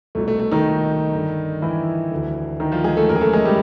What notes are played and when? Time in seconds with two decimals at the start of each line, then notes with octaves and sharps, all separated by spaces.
0.15 C2 B2 A3
0.28 A3
0.39 A3
0.51 D#3 D#4
1.13 G2 D3
1.62 E3 E4
2.10 D2 D3
2.60 D#3 D#4
2.72 F3 F4
2.84 G#3 G#4
2.97 A3 A4
3.08 F#2 C#3 E3 A#3 A#4
3.16 G#4
3.21 A3 A4
3.33 G#3 G#4
3.45 G3 G4